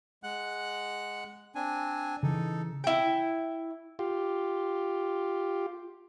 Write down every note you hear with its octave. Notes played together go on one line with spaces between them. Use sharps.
G#3 F#5 F#6
C4 D4 G#5
C#3 E3 D#4 A4
E4 G5
F4 G4